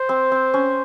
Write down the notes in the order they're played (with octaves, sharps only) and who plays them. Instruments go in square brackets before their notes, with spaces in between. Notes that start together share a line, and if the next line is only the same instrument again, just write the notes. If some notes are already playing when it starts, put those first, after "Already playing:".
Already playing: [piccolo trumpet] C5
[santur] C4
C4
C#4